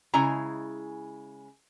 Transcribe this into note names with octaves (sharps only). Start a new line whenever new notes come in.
C#3 G#3 E4 G#5 A#5